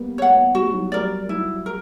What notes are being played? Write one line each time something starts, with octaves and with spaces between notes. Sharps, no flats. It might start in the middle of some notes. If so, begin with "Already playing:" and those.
Already playing: G3 A#3 B3
C#5 F#5
B3
G3 F#4
G3
F#3
G3 A#4 D5
F#3 E4
A#4